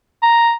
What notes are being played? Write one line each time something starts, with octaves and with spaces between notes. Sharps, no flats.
A#5